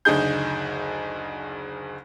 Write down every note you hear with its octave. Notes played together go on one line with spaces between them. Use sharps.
F#1 D2 D4 D#4 G#4 G6